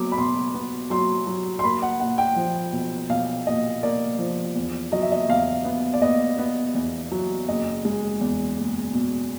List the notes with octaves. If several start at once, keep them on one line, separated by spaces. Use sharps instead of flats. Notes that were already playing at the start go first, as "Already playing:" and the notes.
Already playing: F#3 B3 D6
B5
B2 C6
B3
F#3 C6
F#3
C6
A#3 B5
F#5
A#2 F#5
G5
F3
B1
B1 F5
A#2 D#5
A#3 D5
F3
E2
F#3 D#5
E5
D#5
E2 F5
B3
D5
B3 D#5
B3
E2
F#3
F#1 D#5
G#3
E2
F#1
B2